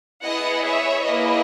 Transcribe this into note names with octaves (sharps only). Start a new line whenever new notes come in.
B3 E4 G#4 D#5 F#5
C#5 E5
A#3 E4 G#4 B4 D#5